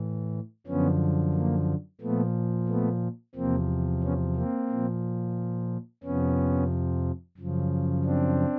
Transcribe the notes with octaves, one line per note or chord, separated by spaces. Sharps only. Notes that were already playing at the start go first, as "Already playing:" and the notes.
Already playing: A2 E3
F#2 D3 F3 B3 C#4
A#3
A#2 F3 A3 B3
A3 B3
E2 C3 F3 A#3 C4
B3 C#4
A#3 C4
A#2 F3
F2 C3 F3 B3 C#4
F#2 C#3 F3
C4 D4